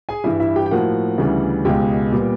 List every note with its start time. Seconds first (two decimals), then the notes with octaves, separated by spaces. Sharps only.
0.09 G#4 G#5
0.24 G2 E3 G3 E4 E5
0.40 E4 E5
0.56 G4 G5
0.66 G5
0.71 A2 F3 A#3 F#4 F#5
1.18 D2 C#3 E3 G3
1.65 C#2 B2 G#3 G4 G5
2.12 A#2 G3 B3